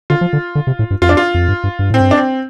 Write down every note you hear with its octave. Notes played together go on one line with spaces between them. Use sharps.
D3 F4
F3
D3
D3
C3
A2
G2
F2 F4
D4
F4
F2
G2
G2
G2
A2 C4
G2
D4
C4